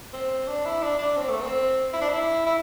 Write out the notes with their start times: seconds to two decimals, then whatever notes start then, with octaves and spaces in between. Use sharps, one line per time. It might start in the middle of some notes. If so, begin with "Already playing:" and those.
0.13 C4
0.47 D4
0.65 E4
0.82 D4
0.98 D4
1.17 C4
1.29 A3
1.41 C4
1.93 E4
2.01 D4
2.09 E4
2.46 E4